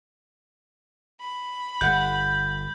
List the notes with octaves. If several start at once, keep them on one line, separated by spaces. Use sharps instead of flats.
B5
G1 F#5 G6